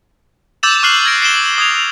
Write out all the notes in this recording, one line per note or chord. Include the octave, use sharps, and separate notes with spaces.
D6 E6 G6 A6 E7 F7
C#6 D6 F6 F#6 C7 F#7
F6 G#6 A#6 D7
C7 D7 E7 G7
D#6 G#6 F7